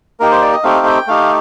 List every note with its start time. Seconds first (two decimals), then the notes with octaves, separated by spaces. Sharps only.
0.20 A#3 D#4 G4 A#4
0.31 C5
0.42 D5
0.53 D#5
0.63 A3 C4 D#4 G4 F5
0.86 G5
1.07 A3 D#4 G4 F5